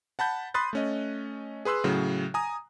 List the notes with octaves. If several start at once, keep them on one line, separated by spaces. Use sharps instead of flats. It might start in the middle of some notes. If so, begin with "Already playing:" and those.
F#5 A5 B5 G6
B5 C6 D#6 F#6 A6
A3 C#4 D#5
G#4 B4 C6 E6 F#6
A2 C#3 F#3
G#5 A#5 D#6